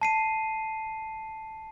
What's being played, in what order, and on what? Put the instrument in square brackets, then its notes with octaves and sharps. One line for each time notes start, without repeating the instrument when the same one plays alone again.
[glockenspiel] A5 C7 D#7